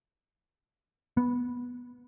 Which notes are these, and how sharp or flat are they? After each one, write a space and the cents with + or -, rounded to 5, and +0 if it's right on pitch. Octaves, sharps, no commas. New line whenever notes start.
B3 -10